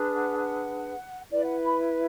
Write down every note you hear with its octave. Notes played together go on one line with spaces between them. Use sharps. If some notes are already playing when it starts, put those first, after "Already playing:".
Already playing: D4 G#4 B4
F#5
F#5
E4 B4 D5
F#5
B5